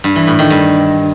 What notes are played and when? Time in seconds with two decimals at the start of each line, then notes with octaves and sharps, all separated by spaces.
0.04 G2
0.16 E3
0.27 A2
0.39 D#3
0.50 G2